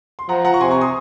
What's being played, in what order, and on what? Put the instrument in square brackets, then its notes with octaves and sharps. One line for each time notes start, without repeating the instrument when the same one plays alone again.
[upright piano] C6
[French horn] F3 [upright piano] F#5 A#5
[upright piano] F#5 A#5
C#6
[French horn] C3 [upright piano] G#5 C6
[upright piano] A#5 C#6
C6 D#6